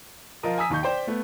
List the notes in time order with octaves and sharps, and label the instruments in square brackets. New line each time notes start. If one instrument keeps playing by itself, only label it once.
[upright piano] F3 F4 A#4 D#5
G#5 A#5 D#6 E6 B6
D#2 D#4 C#6 G6
C5 D5 G5
A3 B3